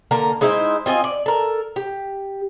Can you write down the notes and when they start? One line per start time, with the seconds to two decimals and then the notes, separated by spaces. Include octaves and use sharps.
0.11 D3 A#3 A#5
0.41 G#3 D#4 E4 C5
0.86 C4 F4 D#5 G#5
1.04 D5
1.26 A4 A#4
1.76 G4